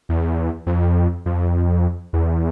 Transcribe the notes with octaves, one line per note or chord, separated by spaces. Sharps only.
E2
F2
F2
E2